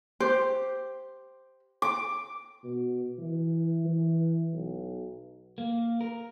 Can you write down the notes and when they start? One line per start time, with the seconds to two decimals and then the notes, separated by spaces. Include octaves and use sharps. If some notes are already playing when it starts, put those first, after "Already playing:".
0.20 G4 C5
1.82 D6
2.64 B2
3.18 E3
3.85 E3
4.53 B1
5.58 A#3
6.01 A#4